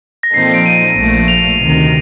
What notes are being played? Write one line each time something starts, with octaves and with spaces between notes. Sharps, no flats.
A#6
A#2 F3 C4 D#4 A4 C7
D7
D#7
A#1 A#2 F3 A3
F7
D2 C3 D#3